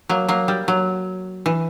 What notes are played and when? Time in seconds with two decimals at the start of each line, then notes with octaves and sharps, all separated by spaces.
0.09 F#3 A#3
0.28 F#3 A#3
0.48 G3
0.68 F#3
1.46 E3